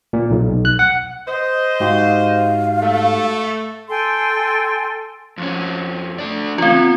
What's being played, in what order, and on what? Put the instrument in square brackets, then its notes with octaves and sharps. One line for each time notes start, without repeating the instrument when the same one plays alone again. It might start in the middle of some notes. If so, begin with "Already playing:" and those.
[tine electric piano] A#2
B1
F#6
F#5
[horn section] C5 D#5
[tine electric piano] G#2 F#4 G4 [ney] F5
[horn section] A3
[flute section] A4 G5 G#5 C6
[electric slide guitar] F2 C#4
A3 D4 D5
[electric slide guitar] A2 C#3 E3 [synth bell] C4 F4
[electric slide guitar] B3